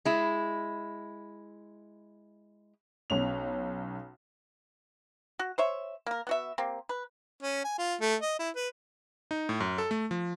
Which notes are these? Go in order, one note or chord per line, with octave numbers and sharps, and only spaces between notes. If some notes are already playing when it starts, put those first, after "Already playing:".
G#3 E4
B1 C#4 F7
F#4
C5 C#5 E5
A#3 A#4
B3 F#4 E5
A#3 C4 G4
B4
C#4
G#5
F4
A3
D#5
E4
B4
D#4
A2
F#2
A4
A3
F3